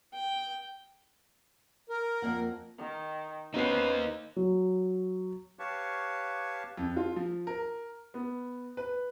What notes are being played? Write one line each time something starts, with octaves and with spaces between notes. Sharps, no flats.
G5
A#4
F2 A#3 F#5
D#3
A#3 B3 C#4 D#4 B4 C5 C7
F#3
G4 B4 C#5 F5 A5 C#6
F2
F4
F3
A#4
B3
B4